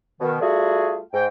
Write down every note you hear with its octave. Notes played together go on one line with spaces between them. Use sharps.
B2 D#3
G3 A3 F4 F#4 G#4
G#2 G5